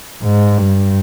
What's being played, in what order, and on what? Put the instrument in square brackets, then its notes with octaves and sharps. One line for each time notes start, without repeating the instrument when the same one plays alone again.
[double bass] G#2
G2